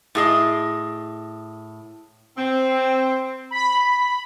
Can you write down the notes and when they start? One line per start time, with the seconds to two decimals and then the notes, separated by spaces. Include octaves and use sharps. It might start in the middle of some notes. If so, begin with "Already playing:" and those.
0.15 A2 G#4 D#5
2.38 C4
3.51 B5